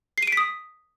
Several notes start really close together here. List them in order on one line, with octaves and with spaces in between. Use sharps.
C7 D#7 D7 B6 D#6